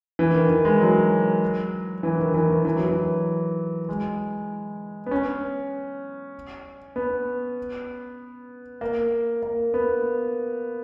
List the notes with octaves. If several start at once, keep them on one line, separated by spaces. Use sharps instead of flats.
E3
D#3
E3
G#3
F#3
E3
D#3
E3
D#3
E3
F#3
E3
G#3
B3
C#4
B3
A#3
A#3
B3